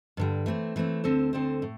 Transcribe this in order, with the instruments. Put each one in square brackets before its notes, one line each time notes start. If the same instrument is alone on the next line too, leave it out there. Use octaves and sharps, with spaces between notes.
[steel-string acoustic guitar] G2 D3 G3
E3 A3 C4
E3 A3 C4
D2 D3 C4 A4 C5
D2 D3 C4 A4 C5
A2